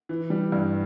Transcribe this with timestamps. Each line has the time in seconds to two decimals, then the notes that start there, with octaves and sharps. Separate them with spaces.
0.09 E3
0.30 G3
0.52 G2